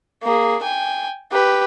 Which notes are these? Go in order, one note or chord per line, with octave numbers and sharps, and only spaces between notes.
A#3 G#4
G5 G#5
G4 B4